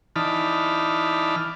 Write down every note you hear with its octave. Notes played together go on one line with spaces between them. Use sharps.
E3 D#4 D5 A5 B5 F6